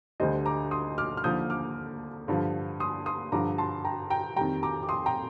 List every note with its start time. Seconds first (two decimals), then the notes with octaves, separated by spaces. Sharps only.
0.20 D2 D3 G3 C5 D#5
0.46 A#5 D6
0.71 C6 D#6
0.98 D6 F6
1.17 F6
1.24 D#2 D3 F3 D#6 G6
1.50 D6 F6
2.28 G2 D3 F3
2.80 C6 D#6
3.06 C6 D#6
3.32 G2 D3 F3 A#5 D6
3.58 A5 C6
3.84 G5 A#5
4.10 G5 A#5
4.36 F2 D#3 G3 G5 A#5
4.63 A#5 D6
4.83 D6
4.89 C6 D#6
5.06 G5 A#5